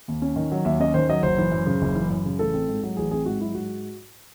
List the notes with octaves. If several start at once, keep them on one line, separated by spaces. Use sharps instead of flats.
D#2
C#4
D#3
F#3
D#2 E5
C#4 D#5
D#3 C5
F#3 D#5
F#1 C5
E3
F#2
C#3
F#1
E3
F#2
C#3
A1 A4
C4
G#2
F#3
A1 G#4
C4 G#4
G#2 F#4
F#3 E4
G#2 F#4